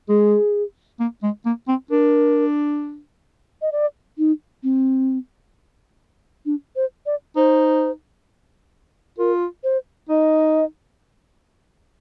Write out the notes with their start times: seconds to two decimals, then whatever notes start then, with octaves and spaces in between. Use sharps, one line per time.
0.09 G#3 G#4
1.00 A#3
1.23 G#3
1.45 A#3
1.68 C4
1.90 D4 A#4
3.62 D#5
3.72 D5
4.18 D#4
4.63 C4
6.46 D4
6.76 C5
7.06 D5
7.36 D#4 C5
9.18 F4 A#4
9.64 C5
10.09 D#4 D#5